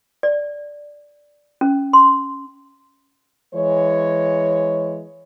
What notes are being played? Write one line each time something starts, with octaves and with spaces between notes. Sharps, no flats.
D5
C#4
C6
E3 G#3 C#5